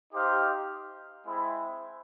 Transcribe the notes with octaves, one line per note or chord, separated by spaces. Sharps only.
D#4 G4 C5 F5
G#3 C4 E4